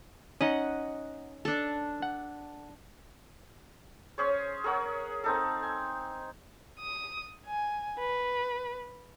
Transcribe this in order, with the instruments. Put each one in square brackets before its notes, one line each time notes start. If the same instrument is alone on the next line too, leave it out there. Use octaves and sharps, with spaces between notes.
[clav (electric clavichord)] C#4 D#4 [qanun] D#5 F#5
[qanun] D4 A4
[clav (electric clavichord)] F#5
[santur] C#4 G#4 C5 C#5
G#4 A#4 C#5 F#5
C4 D#4 A4
G#5
[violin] D#6
G#5
B4